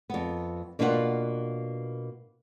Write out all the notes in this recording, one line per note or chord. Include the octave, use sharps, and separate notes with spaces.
F2 B3
B2 A#3 D4 E4 F4 F#5